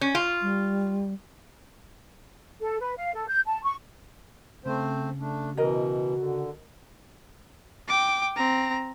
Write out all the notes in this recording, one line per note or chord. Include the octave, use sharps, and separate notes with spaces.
C#4
F4
G3
A4
B4
F5
A4
G6
A5
C#6
C#3 A3 C4 C5
A3 D4
B2 E3 F#4 A#4 D#5
D3
G5 D6
C4 A#5